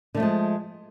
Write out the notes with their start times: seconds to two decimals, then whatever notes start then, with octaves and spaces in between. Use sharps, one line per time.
0.15 D3
0.17 A3
0.20 F3
0.22 G#3